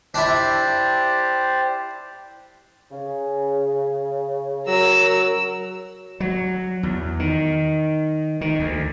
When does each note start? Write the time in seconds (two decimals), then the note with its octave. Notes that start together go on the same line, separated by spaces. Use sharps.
0.14 D4 E4 G4 C5 D5
2.91 C#3
4.67 F#3 A#4 E6
6.20 F#3
6.83 E2
7.19 D#3
8.41 D#3
8.59 D2